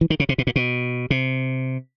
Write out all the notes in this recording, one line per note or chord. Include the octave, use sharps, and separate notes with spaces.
E3
D#3
C#3
C3
B2
A#2
B2
C3